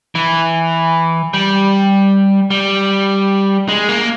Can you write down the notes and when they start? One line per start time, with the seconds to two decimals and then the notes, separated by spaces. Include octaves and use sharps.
0.15 E3
1.34 G3
2.51 G3
3.69 G#3
3.89 A#3